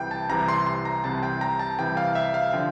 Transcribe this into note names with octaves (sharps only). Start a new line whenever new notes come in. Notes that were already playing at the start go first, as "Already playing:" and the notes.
Already playing: C2 C3 E3 G5
A5
C2 C3 E3 A#5
C6
C6
A#5
C2 C3 E3 A5
G5
A#5
A5
C2 C3 E3 G5
F5
E5
F5
D3 F3 G5